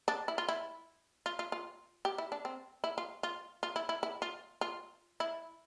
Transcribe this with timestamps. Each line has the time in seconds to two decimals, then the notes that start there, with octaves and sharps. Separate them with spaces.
0.08 D4
0.28 E4
0.38 F4
0.48 E4
1.26 F4
1.39 F4
1.52 F4
2.05 G4
2.18 E4
2.32 D4
2.45 C4
2.84 E4
2.98 F4
3.23 F4
3.63 F4
3.76 E4
3.89 E4
4.03 E4
4.22 F4
4.61 F4
5.20 E4